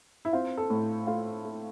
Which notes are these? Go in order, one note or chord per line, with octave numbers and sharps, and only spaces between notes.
E4
C4 F4
A4
A2
A3 F4
A3